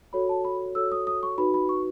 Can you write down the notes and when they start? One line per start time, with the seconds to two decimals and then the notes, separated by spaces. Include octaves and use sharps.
0.13 F#4 A4 C#5 B5
0.29 A5
0.45 B5
0.75 F#4 A4 C#5 E6
0.92 D#6
1.07 D#6
1.23 C#6
1.38 D#4 F#4 B4 B5
1.54 B5
1.69 C#6